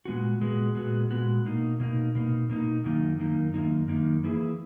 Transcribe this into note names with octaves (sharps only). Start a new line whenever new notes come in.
A#2 G#3 B3 F#4
A#2 G#3 B3 F#4
A#2 G#3 B3 F#4
A#2 G#3 B3 F#4
B2 A#3 D#4
B2 A#3 D#4
B2 A#3 D#4
B2 A#3 D#4
F#2 D#3 A#3 D#4
F#2 D#3 A#3 D#4
F#2 D#3 A#3 D#4
F#2 D#3 A#3 D#4
E3 A#3 E4 G#4